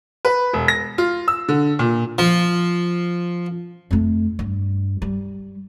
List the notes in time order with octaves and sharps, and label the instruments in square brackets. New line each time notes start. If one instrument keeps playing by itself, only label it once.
[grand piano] B4
E1
A#6
F4
E6
D3
A#2
[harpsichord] F3
[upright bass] F2 A3
G2
G3